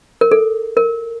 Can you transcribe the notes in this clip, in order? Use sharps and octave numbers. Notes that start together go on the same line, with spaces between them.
A#4
A4
A#4